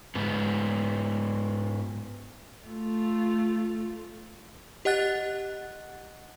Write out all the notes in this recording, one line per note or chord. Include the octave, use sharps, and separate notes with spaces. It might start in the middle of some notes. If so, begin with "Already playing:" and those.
G#2 B3
A3 F4
G4 D#5 F#5 F#6 A6